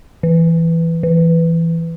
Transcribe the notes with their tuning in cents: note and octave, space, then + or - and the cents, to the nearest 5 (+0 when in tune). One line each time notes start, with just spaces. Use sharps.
E3 +5
E3 +10